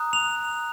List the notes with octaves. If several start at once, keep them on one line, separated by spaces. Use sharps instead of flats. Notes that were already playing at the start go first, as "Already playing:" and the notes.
Already playing: A#5 D#6 F#6
F7